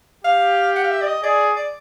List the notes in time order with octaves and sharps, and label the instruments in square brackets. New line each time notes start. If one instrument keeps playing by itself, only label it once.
[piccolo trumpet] G4 [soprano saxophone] F5
[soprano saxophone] F#5
F5
E5
D5
D#5
[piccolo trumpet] G#4 [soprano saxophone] D5
[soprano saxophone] D5